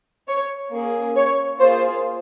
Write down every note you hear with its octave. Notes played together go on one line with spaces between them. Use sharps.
C#5
A#3 C#4 G#4
C#5
A#3 F4 G#4 C5